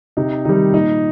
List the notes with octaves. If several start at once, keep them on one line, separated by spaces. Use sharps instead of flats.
C3 D#4
D#3 G3 D#4
A#2 D#4